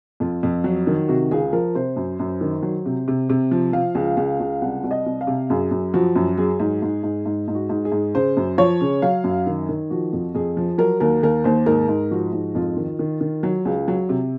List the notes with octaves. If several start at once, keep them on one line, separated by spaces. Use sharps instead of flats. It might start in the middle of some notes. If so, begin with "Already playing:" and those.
F2 F4
F2
F#3
D#3
C3 F#4
C#2 G#4
F3 A#4
C3 C5
F#2
F#2
D#3
F#3
C3
C3
C3
F3
F3 F5
C#2
C#2 F5
C#2
C2 F#5
C2
D#5
C2
F5
C3
F#2 G#4
F#2
F3 F#4
F#2
F#3 G#4
G#2
G#2
G#2
G#2
G#2
F#4
G#2
G#4
G#2
C#3 C5
F#2
F3 C#5
C#3
F#3 F5
F#2
D#3
D#3
F3 F#4
F2
F2 G#4
F3
F#3 A#4
D#2 A#4
D#2 A#4
D#2 C5
G#2 A#4
G#2
F3 F#4
G#2
F2 F4
D#3
D#3
D#3
F#3
C#2
F#3
C3